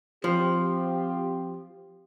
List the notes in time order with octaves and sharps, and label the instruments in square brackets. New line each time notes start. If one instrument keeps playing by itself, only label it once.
[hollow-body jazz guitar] F3 [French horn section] C4 F4 G4